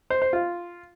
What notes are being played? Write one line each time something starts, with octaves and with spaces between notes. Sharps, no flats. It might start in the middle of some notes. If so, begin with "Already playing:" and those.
C5
C5
F4